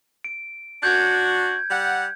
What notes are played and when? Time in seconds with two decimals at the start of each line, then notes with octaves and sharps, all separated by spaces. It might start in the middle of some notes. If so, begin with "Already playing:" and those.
0.24 D7
0.83 D4 F#4 G6 G#6
1.70 G3 F#5